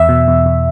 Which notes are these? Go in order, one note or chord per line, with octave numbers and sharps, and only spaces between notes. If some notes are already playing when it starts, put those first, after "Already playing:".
Already playing: E2 E5
B2
E2
E2